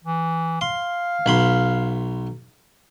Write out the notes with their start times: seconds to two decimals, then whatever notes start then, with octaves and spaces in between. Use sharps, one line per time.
0.04 E3
0.61 F5 C6
1.26 B1 B5 C6